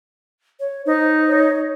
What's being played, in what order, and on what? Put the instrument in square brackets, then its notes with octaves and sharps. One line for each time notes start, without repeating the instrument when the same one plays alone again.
[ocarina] C#5
[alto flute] D#4 [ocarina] C5
[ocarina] C#5